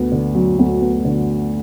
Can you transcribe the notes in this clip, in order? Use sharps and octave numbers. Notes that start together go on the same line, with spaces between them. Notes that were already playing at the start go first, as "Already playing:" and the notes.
Already playing: D2 B3
D3
F#3
D2
B3
D3